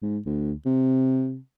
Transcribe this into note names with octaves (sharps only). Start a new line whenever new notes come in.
G#2
D2
C3